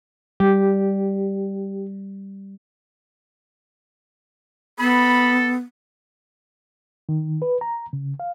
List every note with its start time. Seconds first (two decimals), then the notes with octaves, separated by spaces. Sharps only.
0.40 G3 G4
4.79 B3 A4 B5
7.09 D#3
7.42 B4
7.61 A#5
7.93 C#3
8.20 F5